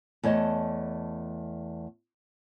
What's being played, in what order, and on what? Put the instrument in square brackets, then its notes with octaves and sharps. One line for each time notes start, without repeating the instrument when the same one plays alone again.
[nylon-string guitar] E2 A3 C#5 D#5 A5